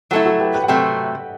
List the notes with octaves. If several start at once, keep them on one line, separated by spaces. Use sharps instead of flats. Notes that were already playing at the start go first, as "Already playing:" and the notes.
F#3 A3 E4 F#4 A4
F#4 A4
G4 B4
G4 B4
F#5
C3 F#3 A3 E5 G5